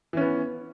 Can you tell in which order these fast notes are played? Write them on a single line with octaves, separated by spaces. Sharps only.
E3 C#4 B3